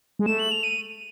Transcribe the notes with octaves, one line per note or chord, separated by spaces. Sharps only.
G#3
A3 E7
F#7
F7
D#7